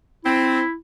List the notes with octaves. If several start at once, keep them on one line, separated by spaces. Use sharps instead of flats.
C4 E4